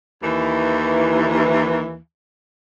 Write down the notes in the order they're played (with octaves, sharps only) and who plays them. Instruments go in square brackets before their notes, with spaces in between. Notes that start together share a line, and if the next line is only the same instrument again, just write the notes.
[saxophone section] D#2 E3